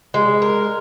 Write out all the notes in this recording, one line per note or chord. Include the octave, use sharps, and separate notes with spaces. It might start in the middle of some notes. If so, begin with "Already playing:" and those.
G#3
A#4